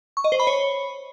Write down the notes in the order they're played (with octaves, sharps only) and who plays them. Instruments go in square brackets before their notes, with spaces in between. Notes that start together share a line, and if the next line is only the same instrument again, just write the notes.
[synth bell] C#6
D#5
C5
B5
C#5